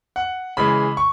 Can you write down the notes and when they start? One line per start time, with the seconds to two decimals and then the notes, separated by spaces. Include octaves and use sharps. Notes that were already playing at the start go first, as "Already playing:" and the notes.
0.16 F#5
0.57 C#3 E3 G#3 B5
0.97 C#6